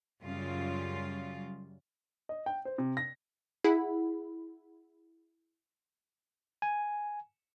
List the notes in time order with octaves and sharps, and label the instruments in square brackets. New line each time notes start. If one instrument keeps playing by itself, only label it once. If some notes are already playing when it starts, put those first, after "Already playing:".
[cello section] F#2 C#3 G3 F4
[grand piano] D#5
G5
C5
C3
A#6
[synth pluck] E4 G#4 F#5 B5
[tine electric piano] G#5